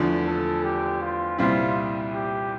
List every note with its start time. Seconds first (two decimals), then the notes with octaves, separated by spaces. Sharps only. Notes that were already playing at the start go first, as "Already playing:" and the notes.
Already playing: E2 D3 F3 A3
0.27 A4
0.64 G4
1.02 F4
1.38 C2 A#2 G3 C4 E4 F4
2.13 G4